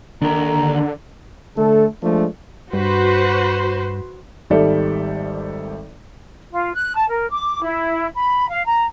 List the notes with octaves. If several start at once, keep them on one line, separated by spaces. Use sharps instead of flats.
D#2 D3 D4 A#4 A#5
D3 A3 A4
F3 G#3 A3 D4
G2 F#4 B4 C5
G#1 D#3 G3 A4 D5 E5
F4
F#6
A5
A#4
D6
E4
B5
F5
A#5